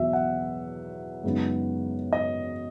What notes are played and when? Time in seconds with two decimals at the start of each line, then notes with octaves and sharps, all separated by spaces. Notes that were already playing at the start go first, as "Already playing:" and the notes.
Already playing: E2 B2 F#3 E5
0.13 F#5
1.23 F#2 C#3 G#3 B3 D#4
2.13 D#5